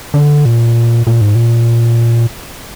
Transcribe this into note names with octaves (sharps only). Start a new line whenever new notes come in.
D3
A#2
A#2
G#2
A#2